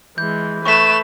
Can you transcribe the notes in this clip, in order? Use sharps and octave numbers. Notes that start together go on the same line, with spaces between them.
E3 G#3 G6
A3 B4 C#6 B6 E7